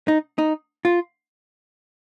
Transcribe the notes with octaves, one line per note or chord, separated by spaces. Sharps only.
D#4
D#4
F4